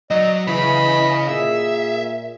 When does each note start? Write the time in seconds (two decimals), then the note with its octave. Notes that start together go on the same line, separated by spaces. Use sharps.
0.11 F#3 D5 D#5
0.47 C#3 E3 B5
1.29 A#2 G#4 E5